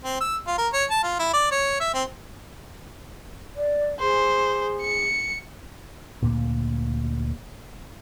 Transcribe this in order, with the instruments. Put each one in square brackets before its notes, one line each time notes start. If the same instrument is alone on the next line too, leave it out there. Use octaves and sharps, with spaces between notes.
[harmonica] C4
E6
F4
A#4
C#5
A5
F4
E4
D5
C#5
E5
C4
[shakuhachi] D5
[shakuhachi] G#4 [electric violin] C5
[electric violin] C#7
[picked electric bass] D2 A#2 A#3